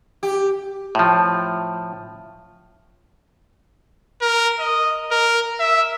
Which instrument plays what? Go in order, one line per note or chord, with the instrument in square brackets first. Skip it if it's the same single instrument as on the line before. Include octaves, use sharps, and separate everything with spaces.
[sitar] G4
[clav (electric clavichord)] A2 F3
[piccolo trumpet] A#4
D#5
A#4
E5